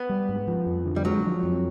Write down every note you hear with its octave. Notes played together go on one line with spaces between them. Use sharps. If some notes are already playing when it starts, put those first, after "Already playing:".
Already playing: B3
G3
G#2
F3
F2
D3
G3
F#3 G#3
F3
F2